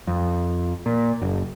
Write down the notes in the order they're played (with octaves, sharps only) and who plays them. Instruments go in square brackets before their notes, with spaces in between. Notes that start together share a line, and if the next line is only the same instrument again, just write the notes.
[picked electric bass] F2
A#2
F#1